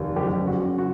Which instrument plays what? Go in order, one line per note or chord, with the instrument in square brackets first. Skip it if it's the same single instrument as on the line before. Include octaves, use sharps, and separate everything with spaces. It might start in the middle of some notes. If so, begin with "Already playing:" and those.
Already playing: [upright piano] F1 D#2
F#1 G4
C#3
F#4
F#2
F#4